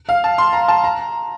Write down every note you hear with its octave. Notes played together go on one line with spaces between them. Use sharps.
F5
A5
C6
A#5
A5
A#5